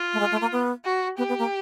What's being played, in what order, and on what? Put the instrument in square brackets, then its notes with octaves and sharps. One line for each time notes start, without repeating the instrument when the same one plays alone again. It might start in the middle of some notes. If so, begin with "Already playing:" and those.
Already playing: [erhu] F4
[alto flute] A3
G#3
A3
A#3
B3
[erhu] F#4
[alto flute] B3 [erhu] G4
[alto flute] B3
A#3